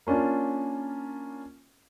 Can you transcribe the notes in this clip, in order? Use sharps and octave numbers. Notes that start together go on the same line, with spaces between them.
A#3 C#4 D4 F4 A5